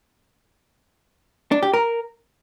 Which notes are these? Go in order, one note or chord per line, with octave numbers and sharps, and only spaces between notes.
D4
G4
A#4